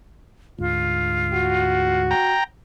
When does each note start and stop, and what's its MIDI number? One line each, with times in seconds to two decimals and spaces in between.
0.59 2.15 38
0.59 2.15 44
0.59 2.02 65
1.33 2.35 66
2.11 2.44 79
2.11 2.44 82